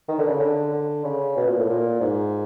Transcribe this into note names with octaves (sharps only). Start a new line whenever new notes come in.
D#3
D3
C#3
D3
D3
C#3
B2
A#2
A2
A#2
G#2